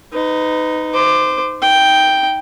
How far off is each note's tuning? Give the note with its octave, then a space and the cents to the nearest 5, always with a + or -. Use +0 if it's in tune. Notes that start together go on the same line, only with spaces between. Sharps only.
D#4 +0 B4 +35
C5 -20 D6 +15
D#4 +15 G5 +0